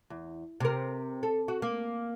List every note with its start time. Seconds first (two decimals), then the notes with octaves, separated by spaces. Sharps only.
0.10 E2
0.60 C3 A#4
1.23 A4
1.48 F#4
1.62 A#3